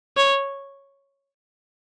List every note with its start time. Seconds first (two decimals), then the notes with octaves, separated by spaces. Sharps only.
0.17 C#5